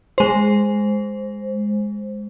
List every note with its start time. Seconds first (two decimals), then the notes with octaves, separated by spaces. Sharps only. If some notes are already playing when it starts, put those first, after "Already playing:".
0.18 G#3 C5